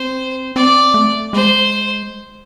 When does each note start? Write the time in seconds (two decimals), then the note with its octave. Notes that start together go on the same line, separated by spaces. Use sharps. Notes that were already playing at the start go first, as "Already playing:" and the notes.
Already playing: C4 C5
0.56 C4 D5
0.94 A3
1.33 G#3 C5